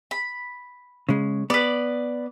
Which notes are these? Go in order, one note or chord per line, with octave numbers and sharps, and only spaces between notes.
B5
C#3 G#3
B3 B4 D5